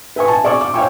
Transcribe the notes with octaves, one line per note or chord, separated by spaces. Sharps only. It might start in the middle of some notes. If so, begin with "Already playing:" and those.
B4 E5 G#5 C#6
G#5 A5
G#4 D5 G#5 C#6 D6
D6
C#5 E5 F5 G5 G#5 C#6